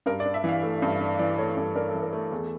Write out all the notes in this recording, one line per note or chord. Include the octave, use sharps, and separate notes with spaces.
G2 A#4
D5
D4
E5
E3 F5
A3
G2
D4
E3 D5
A3 C#5
G2 A4
D4 A#4
E3 A4
A#4
A3
E2